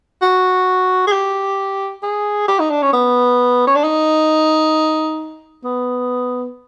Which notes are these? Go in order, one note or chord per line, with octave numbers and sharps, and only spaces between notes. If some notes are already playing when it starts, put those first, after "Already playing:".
F#4
G#4
G4
G#4
G4
D#4
D4
C#4
B3
C#4
D4
D#4
B3